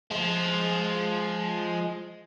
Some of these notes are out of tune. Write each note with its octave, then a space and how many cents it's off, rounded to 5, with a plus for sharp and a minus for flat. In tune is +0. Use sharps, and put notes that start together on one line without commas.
F3 +0 G#3 +10